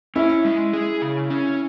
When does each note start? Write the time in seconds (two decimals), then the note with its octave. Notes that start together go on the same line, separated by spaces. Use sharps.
0.16 C#4 E4
0.45 G#3
0.73 G#4
1.02 C#3
1.30 C#4